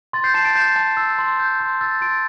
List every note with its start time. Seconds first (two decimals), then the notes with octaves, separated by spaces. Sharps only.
0.13 C6 A6
0.24 G6 C7
0.34 A5 C7 E7
0.45 A6 D7
0.55 G6 C7 E7
0.76 A5 G6
0.97 E6 A6
1.19 C6
1.39 G6
1.60 C6
1.81 E6 A6
2.01 C6 A6 D7